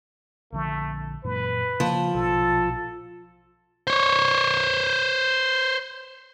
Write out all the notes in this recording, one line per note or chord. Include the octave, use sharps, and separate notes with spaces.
A#1 D3 F3 A3
F#2 A#2 E3 B4
C#3 F3 A#3
A#1 B2 A4
C5 C#5